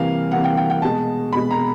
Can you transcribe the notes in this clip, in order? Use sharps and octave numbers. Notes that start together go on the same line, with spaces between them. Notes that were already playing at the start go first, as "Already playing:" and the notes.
Already playing: C3 E3 G3 A#3 F5
C3 E3 G3 A#3 F#5
G5
G5
G5
B2 G#3 A5
B2 G#3 B5
A#5